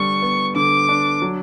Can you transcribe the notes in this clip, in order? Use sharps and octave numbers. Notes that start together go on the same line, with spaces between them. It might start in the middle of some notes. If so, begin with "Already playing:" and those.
Already playing: D3 G3 B3 D4 C#6
B3
D3 D6
D4
F#3